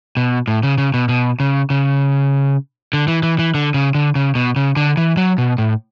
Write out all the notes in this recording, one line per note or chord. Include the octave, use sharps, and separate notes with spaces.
B2
A2
C#3
C#3
B2
B2
C#3
C#3
D3
E3
E3
E3
D3
C#3
D3
C#3
B2
C#3
D3
E3
F#3
B2
A2